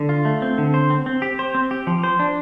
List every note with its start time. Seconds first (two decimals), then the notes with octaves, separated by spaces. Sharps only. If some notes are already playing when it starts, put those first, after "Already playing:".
Already playing: D3
0.09 F4
0.25 A3
0.42 C4
0.58 D3
0.74 C5
0.90 C4
1.06 C4
1.22 G4
1.39 C5
1.54 C4
1.71 G4
1.87 F3
2.04 C5
2.19 D4